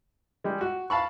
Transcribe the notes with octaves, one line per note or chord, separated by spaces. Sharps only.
G3 G#3
F#4
F5 A5 B5 C#6